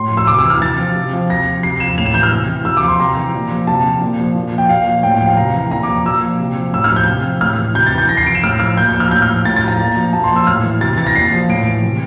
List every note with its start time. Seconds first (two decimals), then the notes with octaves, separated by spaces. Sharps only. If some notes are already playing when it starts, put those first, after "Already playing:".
Already playing: A2 C6
0.11 F3
0.17 E6
0.27 C3 D6
0.39 E6
0.45 E3
0.50 F6
0.62 C3 A6
0.78 F3
0.96 C3
1.13 F3
1.30 C3 A#6
1.46 F3
1.63 C3 C7
1.80 F3 E7
1.98 A2 F7
2.06 E7
2.14 E3 G6
2.23 F6
2.32 C3
2.49 E3
2.65 C3 E6
2.77 D6
2.83 F3
2.88 C6
2.99 C3 A#5
3.17 E3
3.34 A#2
3.51 F3
3.67 C3 A5
3.84 F3
4.01 A#2
4.19 F3
4.35 A#2
4.52 F3
4.58 G5
4.69 A#2 F5
4.87 F3
5.03 A2 G5
5.15 G5
5.21 F3
5.26 F5
5.37 C3 A#5
5.54 E3
5.71 A#2 A#5
5.83 F3 D6
6.06 A#2 E6
6.22 F3
6.40 C3
6.57 F3
6.73 A2 E6
6.84 F6
6.90 F3
6.96 G6
7.07 C3
7.24 F3
7.41 A2 F6
7.58 E3
7.75 C3 G6
7.86 A6
7.93 E3
7.98 G6
8.09 C3 A#6
8.17 C7
8.26 F3 D7
8.35 E7
8.43 A2 F6
8.60 F3 F6
8.77 A#2 G6
8.89 G6
8.94 F3
9.00 F6
9.11 A2 G6
9.22 F6
9.29 F3
9.45 A2 A6
9.56 A6
9.62 F3
9.68 A#5
9.80 A#2
9.96 F3
10.13 A#2 A5
10.24 C6
10.30 F3
10.36 E6
10.47 A2 F6
10.64 E3
10.81 C3 A6
10.98 E3 A6
11.07 A#6
11.15 A#2 C7
11.32 F3
11.49 A2 D7
11.65 E3
11.83 C3